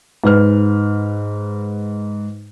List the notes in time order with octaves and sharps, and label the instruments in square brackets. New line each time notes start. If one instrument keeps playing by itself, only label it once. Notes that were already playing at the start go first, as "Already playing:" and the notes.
[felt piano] G#2 B4 F6